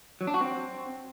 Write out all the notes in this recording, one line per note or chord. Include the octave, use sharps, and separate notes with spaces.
F#3
D4
F#4
C4